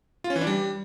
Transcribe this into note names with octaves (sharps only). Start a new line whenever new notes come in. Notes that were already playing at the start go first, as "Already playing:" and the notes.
F4
C#4
E3
D4
G3